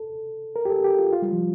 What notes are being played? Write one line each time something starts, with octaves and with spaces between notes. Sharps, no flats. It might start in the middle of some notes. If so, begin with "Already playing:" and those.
Already playing: A4
A#4
G4
A4
G4
F4
F4
G3
F3